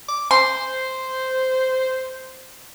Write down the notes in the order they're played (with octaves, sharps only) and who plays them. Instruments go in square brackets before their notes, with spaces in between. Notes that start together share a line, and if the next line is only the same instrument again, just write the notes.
[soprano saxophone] D6
[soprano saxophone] C5 [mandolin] C6